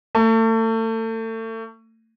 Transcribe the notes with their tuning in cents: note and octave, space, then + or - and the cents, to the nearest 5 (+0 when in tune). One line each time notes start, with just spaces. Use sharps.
A3 +35